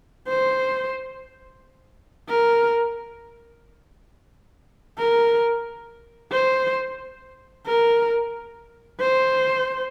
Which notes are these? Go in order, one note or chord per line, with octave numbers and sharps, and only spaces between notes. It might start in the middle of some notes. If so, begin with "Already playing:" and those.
C5
A#4
A#4
C5
A#4
C5